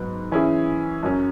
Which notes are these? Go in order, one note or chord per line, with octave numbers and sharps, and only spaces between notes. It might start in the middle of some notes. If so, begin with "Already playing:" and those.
Already playing: G#2 F#3 B3
E3 C#4 E4 G#4
F#2 F#3 C#4